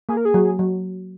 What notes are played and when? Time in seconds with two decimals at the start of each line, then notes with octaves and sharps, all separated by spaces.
0.09 A#3 G#4
0.17 A#4
0.25 G#4
0.34 F#3
0.59 F#3